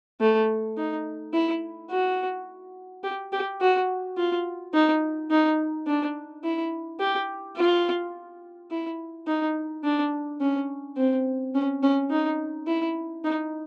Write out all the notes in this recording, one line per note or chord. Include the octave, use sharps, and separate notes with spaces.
A3
D#4
E4
F#4
G4
G4
F#4
F4
D#4
D#4
D4
E4
G4
F4
E4
D#4
D4
C#4
C4
C#4
C#4
D#4
E4
D#4